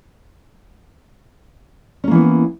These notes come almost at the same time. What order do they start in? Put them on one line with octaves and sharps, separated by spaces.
C#4 A#3 E3 B3